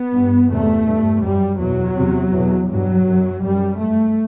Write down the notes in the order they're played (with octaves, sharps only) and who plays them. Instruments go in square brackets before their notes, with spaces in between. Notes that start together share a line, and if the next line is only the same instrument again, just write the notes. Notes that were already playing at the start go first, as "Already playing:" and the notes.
Already playing: [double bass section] B3
G2
E2 C3 A3
G2
F#2 G3
E2 B2 F#3
E2 C3
E2 B2
G2 F#3
F#2
F#2 G3
G2 A3